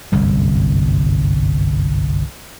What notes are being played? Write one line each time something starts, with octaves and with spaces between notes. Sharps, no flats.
G1 C2 F#2